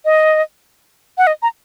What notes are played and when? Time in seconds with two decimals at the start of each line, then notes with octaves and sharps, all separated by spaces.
0.05 D#5
1.18 F#5
1.27 D#5
1.42 A#5